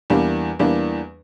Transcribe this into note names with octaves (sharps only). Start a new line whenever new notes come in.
E2 E3 G3 A#3 D4
E2 E3 G3 A#3 D4